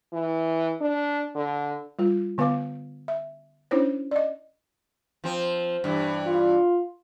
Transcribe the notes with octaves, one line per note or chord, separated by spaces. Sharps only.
E3
D4
D3
G3 F4
D3 B3 B4 F5 D6
E5
C#4 D4 E4 C5 C#5
D5 D#5
F3 C4
G2 E3
F4